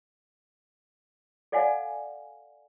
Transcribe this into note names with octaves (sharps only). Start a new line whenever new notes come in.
A4 D5 F5 F#5 G#5